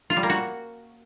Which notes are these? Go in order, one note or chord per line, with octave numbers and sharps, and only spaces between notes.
F4
G3
A#3
F#4